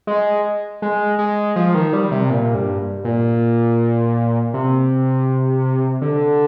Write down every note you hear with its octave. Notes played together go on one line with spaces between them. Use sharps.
G#3
G#3
G#3
F3
D#3
G3
C3
A#2
G2
A#2
C3
D3